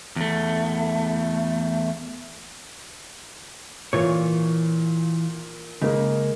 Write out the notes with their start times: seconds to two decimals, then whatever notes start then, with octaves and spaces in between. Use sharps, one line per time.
0.16 E2 A3
3.93 A#2 E3 F4 C#5
5.82 C#3 G#3 A#3